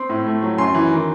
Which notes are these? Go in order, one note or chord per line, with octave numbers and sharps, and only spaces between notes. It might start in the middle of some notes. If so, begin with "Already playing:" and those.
Already playing: C4 C6
A2
A3
F#3
F#2 C6
E3
D#3